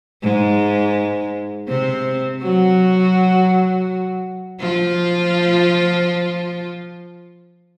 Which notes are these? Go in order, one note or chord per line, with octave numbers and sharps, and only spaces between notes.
G#2 G#3
C3 C4
F#3 F#4
F3 F4